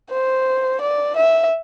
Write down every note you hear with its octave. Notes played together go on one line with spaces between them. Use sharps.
C5
D5
E5